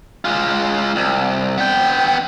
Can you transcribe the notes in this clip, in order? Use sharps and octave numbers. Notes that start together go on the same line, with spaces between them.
G#3 F4
C2
B3 G5